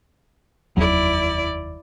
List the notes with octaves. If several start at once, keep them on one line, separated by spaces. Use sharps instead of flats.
F1 D#2 F#3 E4 D5